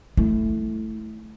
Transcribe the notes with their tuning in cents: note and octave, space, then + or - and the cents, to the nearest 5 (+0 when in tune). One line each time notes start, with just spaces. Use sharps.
A3 +0 E4 -5